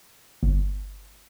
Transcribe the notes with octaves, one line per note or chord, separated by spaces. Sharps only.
G1